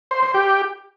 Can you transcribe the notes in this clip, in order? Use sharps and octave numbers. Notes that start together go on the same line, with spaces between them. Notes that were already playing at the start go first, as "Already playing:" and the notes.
C5
C5
G4